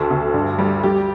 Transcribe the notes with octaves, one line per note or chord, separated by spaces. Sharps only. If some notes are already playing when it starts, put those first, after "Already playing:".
Already playing: D2 A4
D2
G2
G3
G3 G4